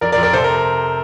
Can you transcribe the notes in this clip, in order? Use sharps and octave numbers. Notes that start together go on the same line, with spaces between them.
F2 A#4 D5
A#4 D5
F2
A#4 D5
C3 A4 C5
A#4